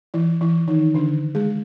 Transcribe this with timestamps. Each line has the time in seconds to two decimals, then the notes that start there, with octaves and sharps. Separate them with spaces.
0.14 E3 E4
0.41 E3 E4
0.68 D#3 D#4
0.94 D3 D4
1.35 G#3 G#4